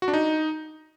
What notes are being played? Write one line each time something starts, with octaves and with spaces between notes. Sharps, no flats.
F#4
D4
D#4